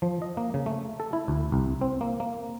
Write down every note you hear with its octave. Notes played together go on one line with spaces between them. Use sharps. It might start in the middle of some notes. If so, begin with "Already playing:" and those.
F3
D#5
A#3
C#3
A3
A4
E4
D2
C2
C4
A#3
A#3